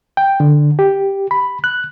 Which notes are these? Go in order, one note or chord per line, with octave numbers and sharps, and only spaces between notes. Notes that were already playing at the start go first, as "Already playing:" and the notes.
G5
D3
G4
B5
F#6